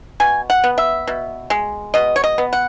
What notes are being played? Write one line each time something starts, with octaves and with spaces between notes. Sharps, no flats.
B2 G#5
F#5
B3
E5
B2
G#3
B2 D#5
C#5
D#5
B3
F#5